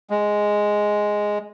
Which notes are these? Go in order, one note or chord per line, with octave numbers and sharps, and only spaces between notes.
G#3